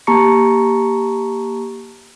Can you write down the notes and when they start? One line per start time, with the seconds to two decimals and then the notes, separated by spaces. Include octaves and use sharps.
0.07 A#3 G4 A5 A#5 C#6 C#7